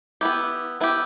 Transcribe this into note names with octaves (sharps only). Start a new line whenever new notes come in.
B3 E4 G4
B3 E4 G4